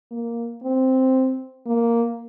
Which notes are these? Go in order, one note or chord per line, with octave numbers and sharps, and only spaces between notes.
A#3
C4
A#3